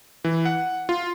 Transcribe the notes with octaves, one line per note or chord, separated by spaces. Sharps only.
E3
F#5
F4